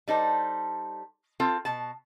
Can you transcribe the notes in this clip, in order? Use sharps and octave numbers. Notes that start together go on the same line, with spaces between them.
G3 D#4 A4 C5
C4 F4 A4
B2 A5